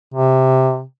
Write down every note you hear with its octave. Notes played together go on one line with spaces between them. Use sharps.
C3